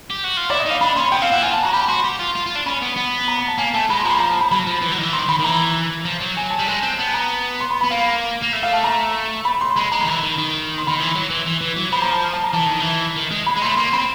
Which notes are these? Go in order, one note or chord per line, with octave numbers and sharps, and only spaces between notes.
G4
F#4
F4
E4 D5
D#5
D#4
F5
D4 B5
C#4 C6
B3 G5
C4 F5
E4 F#5
F4 G#5
A5
A#5
F#4
G4 B5
F#4 C6
G4
F4
F4
F4
D4
C#4 B5
B3
B3
A#5
A#5
A5
A#3 G#5
A3 A5
G#3 B5
C6
F3 A#5
B5
A#5
A5
B5
F#3 B5
F3
E3
F#3
D#3
E3
D#3 C6
D#3 B5
D#3
E3 A#5
F3
F#3
G#5
A5
G3
G#3 G#5
C4
B3 A5
A#5
C6
B5
B5
B3
A#3 F5
A#3
A3
F5
A5
A#5
B5
C6
G#3 B5
G#3 A#5
D#3
E3 B5
D#3
D#3
C6
D#3 B5
E3 C6
F#3
E3
E3
E3
F#3
F3 B5
A#5
A5
A5
A#5
E3 A5
D#3
E3
D#3
G#3
B5
G#3
A3 C6
A#3 C6
C4 B5